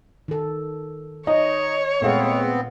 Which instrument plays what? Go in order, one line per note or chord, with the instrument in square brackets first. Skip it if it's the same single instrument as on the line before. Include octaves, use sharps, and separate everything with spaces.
[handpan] D#3 A4
[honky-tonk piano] D#4 [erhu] C#5 [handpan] D#5
[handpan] A#2 F5 [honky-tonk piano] G#3 A3 [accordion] B3 C4